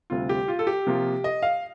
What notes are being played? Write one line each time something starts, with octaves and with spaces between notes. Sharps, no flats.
D2 C3 G3 C4 F4
G4
F4
A4
G4
C3 F3 A#3 F4
D#5
F5